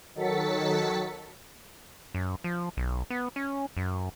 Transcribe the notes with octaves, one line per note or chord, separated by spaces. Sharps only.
D#3 F#3 A4 A6 B6 C#7
F#2
F3
B1
B3
C#4
F#2